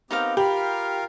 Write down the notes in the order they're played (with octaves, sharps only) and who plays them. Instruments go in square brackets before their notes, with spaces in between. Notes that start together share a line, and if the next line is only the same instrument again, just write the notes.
[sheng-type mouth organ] B3 C4 G4 [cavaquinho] D#4 A#4 F5
[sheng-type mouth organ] F4 A#4 F5 [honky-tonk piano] G4 [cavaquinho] B5